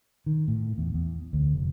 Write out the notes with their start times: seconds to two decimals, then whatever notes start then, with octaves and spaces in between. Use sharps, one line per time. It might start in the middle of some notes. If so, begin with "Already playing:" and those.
0.26 D#3
0.48 A2
0.78 E2
0.94 E2
1.33 D2
1.53 F1